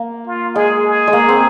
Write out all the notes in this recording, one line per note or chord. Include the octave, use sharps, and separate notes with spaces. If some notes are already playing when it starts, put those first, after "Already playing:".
Already playing: A#3
F4
G#3 G#4
G#4
G#3
A#3
C4